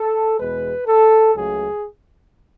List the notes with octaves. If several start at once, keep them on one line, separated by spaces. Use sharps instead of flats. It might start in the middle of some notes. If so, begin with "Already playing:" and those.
Already playing: A4
E2 B2 G#3 B4
A4
C#2 C#3 F#3 A3 G#4